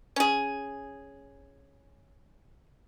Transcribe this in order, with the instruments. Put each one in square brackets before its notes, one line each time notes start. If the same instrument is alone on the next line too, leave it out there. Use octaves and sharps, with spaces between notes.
[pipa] C#4 G#4